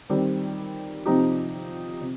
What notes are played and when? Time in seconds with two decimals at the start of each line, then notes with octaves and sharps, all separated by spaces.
0.10 D#3 G3 C4 G4
1.06 C3 F3 C4 D#4 G4
2.01 C3